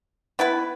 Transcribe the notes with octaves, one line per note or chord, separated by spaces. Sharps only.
B3 E4 B4